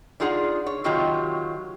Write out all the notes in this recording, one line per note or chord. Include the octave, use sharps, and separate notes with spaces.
D4 D#4 F4 G#4 F#5
C#5
C3 D#3 F#3 F4 G4